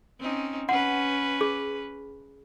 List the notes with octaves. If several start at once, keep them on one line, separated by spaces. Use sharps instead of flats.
C4 C#4 D#4
C#4 B4 F#5
G#4